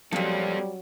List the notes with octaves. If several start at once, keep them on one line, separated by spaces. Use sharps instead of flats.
F2 A#2 F#3 G3 C4 A4